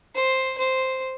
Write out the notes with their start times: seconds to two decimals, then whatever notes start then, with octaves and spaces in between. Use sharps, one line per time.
0.15 C5
0.58 C5